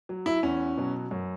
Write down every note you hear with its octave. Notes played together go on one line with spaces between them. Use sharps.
F#3
E4
E2 C#4
B2 F#3
F#2